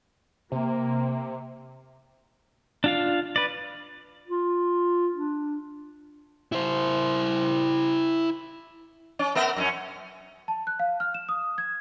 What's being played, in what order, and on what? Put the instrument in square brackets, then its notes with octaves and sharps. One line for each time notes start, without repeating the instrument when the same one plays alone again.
[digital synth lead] C3 [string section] A#3
[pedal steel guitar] D4 F4 F5
B4 D5
[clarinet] F4
D4
[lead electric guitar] E4 C5
[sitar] C#4
B3 A#4 E5
F#2 C4 C#4
[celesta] A5
F#6
F5
F6
E7
D#6
G#6